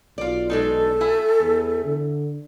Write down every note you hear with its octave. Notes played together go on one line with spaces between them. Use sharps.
B1 F4 D5
G#3 D4 D#4 A4
E4 E5 G#5
E2
D3